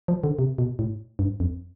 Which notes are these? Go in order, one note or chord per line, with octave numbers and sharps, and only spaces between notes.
F3
D3
C3
B2
A2
G2
F2